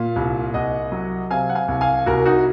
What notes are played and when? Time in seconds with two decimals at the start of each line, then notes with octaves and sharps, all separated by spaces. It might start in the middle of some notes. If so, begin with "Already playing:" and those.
Already playing: A#2 F5
0.16 C2
0.54 C2 D#5 F#5
0.92 F#3
1.31 C3 F5 G#5
1.49 F#5
1.55 F5 G#5
1.68 C2
1.81 F5 G#5
2.06 C2 F#4 A#4
2.26 D#4 F#4